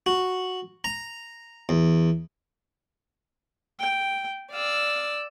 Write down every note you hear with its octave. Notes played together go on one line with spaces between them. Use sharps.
F#4
A#5
E2
G5
D5 F5 E6